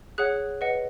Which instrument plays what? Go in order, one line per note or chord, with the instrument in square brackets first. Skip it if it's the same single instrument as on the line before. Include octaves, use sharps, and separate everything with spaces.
[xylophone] G#4 C#5 F#5 F#6
B4 D#5 F#5